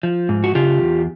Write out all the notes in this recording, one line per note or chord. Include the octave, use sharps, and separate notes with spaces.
F3
G#2
F#4
C#3 F4 G4
E2